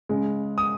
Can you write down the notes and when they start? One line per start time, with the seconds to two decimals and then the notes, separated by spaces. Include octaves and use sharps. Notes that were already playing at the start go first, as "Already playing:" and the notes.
0.09 C#3 G#3
0.58 D#6